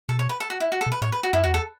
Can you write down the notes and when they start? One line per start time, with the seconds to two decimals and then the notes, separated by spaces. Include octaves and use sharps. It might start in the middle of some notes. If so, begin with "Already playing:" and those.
0.09 B2 A4
0.19 C#5
0.29 B4
0.40 A4
0.50 F#4
0.60 E4
0.72 F#4
0.81 A4
0.86 B2
0.92 B4
1.02 A2 C#5
1.12 B4
1.23 F#4
1.33 F#2 E4
1.44 F#4
1.46 E2
1.54 A4